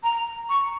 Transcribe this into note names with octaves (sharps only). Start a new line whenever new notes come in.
A#5
C#6